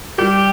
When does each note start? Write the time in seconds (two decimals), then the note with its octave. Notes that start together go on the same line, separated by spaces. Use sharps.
0.18 G3 G4